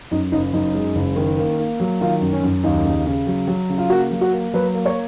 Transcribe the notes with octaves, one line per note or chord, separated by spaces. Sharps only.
F#2 D#4
F#1 D#4
F#2 D#4
G#3
F#1
D#3
A#3
A#3
F#3
D#3 F4
F#2
C#4
F#2
D#2 D#4
C#3
C#3
F#3
F#3
C#3
F4
A#3 F#4
F#3
F#4
A#3
F#3 B4
A#3
C#5